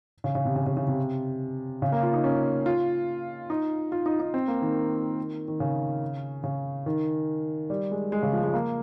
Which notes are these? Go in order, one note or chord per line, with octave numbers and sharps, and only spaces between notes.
C#3
C#3
C3
C#3
C#3
C#3
C3
C#3
A#3
F4
D#4
C#4
F4
D#4
F4
D#4
D#4
C4
A#3
D#3
D#3
C#3
C#3
D#3
G3
G#3
G#3
C#3
F3
G#3
A#3